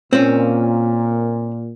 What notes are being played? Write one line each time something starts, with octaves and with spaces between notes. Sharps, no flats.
A#2 C4 C#4